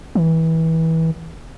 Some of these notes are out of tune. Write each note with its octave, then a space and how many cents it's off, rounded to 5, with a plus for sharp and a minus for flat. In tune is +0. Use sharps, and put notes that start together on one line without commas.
E3 -25